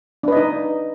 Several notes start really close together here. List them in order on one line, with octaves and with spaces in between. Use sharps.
D4 B4 D#5 D#4